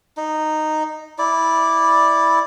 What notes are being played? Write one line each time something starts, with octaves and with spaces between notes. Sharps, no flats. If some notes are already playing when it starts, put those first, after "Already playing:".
D#4
E4 D5